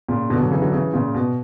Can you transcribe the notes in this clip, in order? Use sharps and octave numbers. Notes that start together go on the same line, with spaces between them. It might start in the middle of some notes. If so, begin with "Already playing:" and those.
A#2 C#3
B2 D3
D3 F#3
C#3 E3
D3 F#3
C#3 E3
A#2 C#3
B2